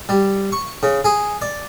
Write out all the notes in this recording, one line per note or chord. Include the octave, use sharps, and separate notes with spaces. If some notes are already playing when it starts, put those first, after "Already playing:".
G3
C#6
C#3
G#4
D5